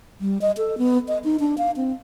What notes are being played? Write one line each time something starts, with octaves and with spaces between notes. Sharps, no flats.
G3
D#5
A4
B3
D#5
D#4
D4
F5
C4